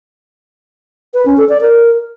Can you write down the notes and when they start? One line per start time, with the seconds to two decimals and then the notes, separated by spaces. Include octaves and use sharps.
1.14 B4
1.26 C#4
1.37 A4
1.49 D5
1.61 A#4